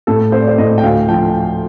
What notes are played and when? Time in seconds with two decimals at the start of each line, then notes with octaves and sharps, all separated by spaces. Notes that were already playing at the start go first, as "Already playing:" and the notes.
0.07 A2 A4
0.32 C4 C5
0.40 D5
0.48 C5
0.58 A2 D#5
0.78 G5
0.83 D2 F5
1.08 F3 G5